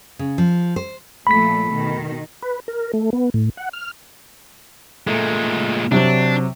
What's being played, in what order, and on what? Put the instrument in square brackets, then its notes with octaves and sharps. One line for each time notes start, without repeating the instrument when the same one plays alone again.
[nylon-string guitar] C#3
F3
C5
[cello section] A#2 F3 A3 [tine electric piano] B5 B6
[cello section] B2 D#3
[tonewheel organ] B4
A#4
A3
B3
A2
F#5
F6
[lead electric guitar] A#2 G#3 [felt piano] A3
[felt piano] C3 F#3 C4 [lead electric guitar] D4